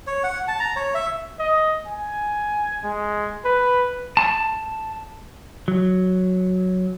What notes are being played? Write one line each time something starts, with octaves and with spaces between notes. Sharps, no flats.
C#5
F#5
A5
A#5
C#5
E5
D#5
G#5
G#3
B4
A5
F#3